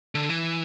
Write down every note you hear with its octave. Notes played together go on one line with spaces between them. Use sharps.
D3
E3